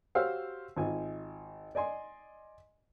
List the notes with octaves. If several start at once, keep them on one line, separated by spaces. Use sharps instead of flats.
F#4 G4 C5 C#5 F5 E6
G#1 F4 G#5
D5 D#5 G#5 C6